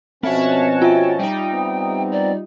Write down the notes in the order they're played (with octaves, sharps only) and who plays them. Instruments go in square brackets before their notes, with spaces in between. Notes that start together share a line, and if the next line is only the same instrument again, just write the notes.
[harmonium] B2 F3 C#4 [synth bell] C4 [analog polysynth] F#4 C#5 A5 [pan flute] E5
[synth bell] F4 E5 [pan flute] G5
[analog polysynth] G3 D#4 [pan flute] G5
[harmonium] B3 C4
[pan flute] D5